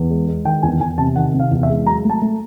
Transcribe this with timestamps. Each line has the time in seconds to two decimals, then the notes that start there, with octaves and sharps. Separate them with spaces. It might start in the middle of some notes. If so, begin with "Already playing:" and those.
Already playing: E2
0.10 G#3
0.28 G#3
0.45 D#3 G5
0.63 E2 G#5
0.80 E2 G#5
0.98 C3 A5
1.16 D#3 F#5
1.34 C3
1.39 F5
1.51 E2
1.63 E5
1.69 G#3
1.86 F#3 A#5
2.04 A3
2.10 A5
2.22 A3